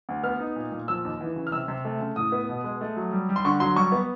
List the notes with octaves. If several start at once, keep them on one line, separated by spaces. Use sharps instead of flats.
D2
B3 F6
D#4
A#2
A#2
F3 E6
D#2
E3
C#3
F6
C3 E6
C3
A3
C#3
A2 D#6
B3
B2
G#3
A3
F#3
G3
G3
C6
D3 C#6
F#3 C6
G3 C#6
B3